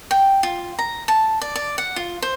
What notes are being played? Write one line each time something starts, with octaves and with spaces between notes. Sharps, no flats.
G5
F4
A#5
A5
D5
D5
F#5
F4
C5